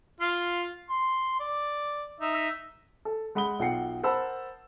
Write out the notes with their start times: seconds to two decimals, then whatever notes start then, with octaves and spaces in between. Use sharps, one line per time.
0.20 F4 F5
0.89 C6
1.40 D5
2.20 D#4 E5
3.05 A4
3.35 G#3 F#5 B5 D#6 G7
3.59 B1 F4 F#5 G5 C7 C#7
4.03 A#4 C5 F#5 A5 B5 E6